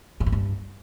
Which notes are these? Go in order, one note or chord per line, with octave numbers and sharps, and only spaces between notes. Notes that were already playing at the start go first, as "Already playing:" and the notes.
A2
G#2
G2